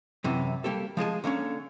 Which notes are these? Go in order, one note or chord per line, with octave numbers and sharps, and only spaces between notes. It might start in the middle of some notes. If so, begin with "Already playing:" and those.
F#2 C3 E3
G3 A#3 G4 A4
F3 G#3 G#4 A5
D3 A#3 C4 C#4